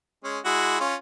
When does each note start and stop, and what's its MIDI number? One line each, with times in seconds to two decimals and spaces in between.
0.24 0.39 56
0.24 0.39 61
0.45 0.79 56
0.45 0.79 64
0.45 0.79 66
0.80 0.95 61
0.80 0.95 65